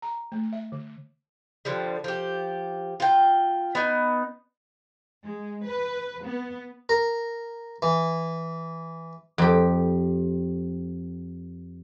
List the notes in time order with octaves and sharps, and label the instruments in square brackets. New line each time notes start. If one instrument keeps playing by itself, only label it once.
[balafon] A#5
A3
E5
D3
[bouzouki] D3 F3 G3
F3 G4
F4 G5
B3 D#4
[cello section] G#3
B4
B3
[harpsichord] A#4
E3
[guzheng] F2 G4